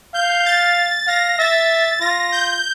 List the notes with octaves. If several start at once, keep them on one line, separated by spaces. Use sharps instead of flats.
F5 G6
A6
F5 A#6
E5 A6
F4 A#6
G6